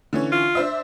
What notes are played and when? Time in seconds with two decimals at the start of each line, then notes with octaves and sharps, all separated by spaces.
0.13 D3 E3 C#4
0.32 F4
0.55 D4 C5 E5